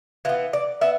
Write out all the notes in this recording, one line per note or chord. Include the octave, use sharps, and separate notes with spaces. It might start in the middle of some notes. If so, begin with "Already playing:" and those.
E3 B3 F4
D5
B3 E5